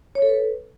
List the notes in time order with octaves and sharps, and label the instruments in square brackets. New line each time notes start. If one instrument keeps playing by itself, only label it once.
[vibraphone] C#5
A4
B4